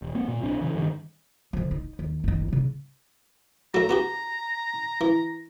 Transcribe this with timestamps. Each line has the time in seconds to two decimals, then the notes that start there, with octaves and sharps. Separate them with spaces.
0.02 D#1
0.15 A#3 C4
0.28 A#2
0.42 B1 C4 D4
0.61 C#3 E3
0.75 G2 D#3
1.53 D3 F3
1.71 D#4
1.99 D#2
2.24 F#1 D#3
2.48 C#3 D#4
3.74 F#3 A3 A#5
3.89 B3 F#4 G4
5.01 E3